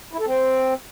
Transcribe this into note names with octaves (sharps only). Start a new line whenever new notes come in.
E4
A4
C4